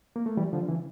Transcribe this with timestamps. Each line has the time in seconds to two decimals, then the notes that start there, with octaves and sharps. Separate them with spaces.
0.16 A#3
0.26 A3
0.37 E3 G3
0.53 D3 F3
0.69 C#3 E3